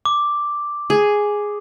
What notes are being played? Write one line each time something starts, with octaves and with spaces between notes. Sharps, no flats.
D6
G#4